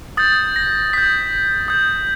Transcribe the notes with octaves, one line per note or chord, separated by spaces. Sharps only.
D#6 G6 A6
A#6
D#6 G6 B6
D#6 G6